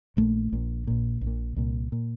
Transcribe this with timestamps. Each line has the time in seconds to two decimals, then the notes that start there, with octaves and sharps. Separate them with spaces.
0.17 A#1 A#2 A3
0.52 A#1 A#2
0.87 A#1 A#2
1.21 A#1
1.27 A#2
1.56 C2 A#2
1.92 A#2